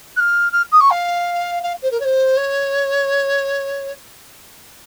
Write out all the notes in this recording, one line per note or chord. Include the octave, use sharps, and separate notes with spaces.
F#6
F6
F6
D#6
C#6
F5
F5
C5
A#4
C#5
C5
C#5